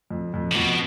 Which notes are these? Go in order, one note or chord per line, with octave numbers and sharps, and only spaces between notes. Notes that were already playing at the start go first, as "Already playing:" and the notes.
F2
F2
C3
F2 B2